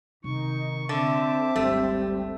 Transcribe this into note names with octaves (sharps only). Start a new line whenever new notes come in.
C3 D#3 D#4 C#6
D3 C4 E5 A5 D6
G#1 D2 G3 A3 G4